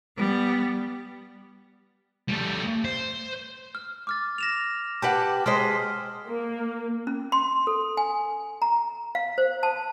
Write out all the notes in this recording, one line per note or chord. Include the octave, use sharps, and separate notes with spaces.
G3 B3
G3 A3
C5
F6
D6 F6 A6
A#6 E7 F7
G4 B4 F#5 A5
G#3 C5 D#5 F6 B6
A#3
C#4
C6
A4
G#5
A#5
F5
C5
A5